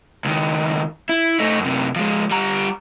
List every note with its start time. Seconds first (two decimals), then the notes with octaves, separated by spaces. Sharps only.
0.25 C#2 D#3
1.09 E4
1.40 A3 D#4
1.60 F#2 C3
1.96 F3 G#3
2.31 G3 A#5